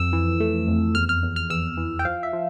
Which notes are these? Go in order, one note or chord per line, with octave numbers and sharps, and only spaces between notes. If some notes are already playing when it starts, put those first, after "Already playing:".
Already playing: F2 E6
E3
A3
F2
E2 F6
F6
E2
F6
E2 E6
E3
G5
F3 F5
E5
F3